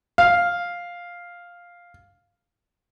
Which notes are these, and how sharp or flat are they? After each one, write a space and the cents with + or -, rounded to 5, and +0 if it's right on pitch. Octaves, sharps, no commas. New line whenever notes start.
F5 +5